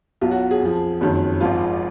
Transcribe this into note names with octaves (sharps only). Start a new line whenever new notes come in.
B1 B2 F#3 F4
F#4
G#4
F2 F3
F#1 F2 D#3 F#3
G#1 G#2 F3 F4